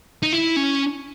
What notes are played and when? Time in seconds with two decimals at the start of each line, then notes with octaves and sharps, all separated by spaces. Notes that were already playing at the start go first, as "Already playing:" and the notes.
0.23 D#4
0.33 E4
0.57 C#4